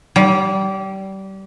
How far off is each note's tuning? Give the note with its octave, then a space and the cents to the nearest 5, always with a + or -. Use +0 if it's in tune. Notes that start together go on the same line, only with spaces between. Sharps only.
G3 -25